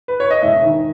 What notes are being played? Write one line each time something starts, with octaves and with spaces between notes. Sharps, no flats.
B4
C#5
D#5
E1 E5
D#3